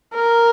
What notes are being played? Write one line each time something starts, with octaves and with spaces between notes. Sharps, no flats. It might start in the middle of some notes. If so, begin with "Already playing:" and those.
A#4